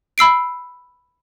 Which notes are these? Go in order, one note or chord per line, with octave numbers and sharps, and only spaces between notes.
B5 E6 C7 D7